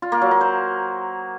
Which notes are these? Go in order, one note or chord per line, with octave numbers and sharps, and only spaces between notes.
F4
A#3
F#3
A#3
C5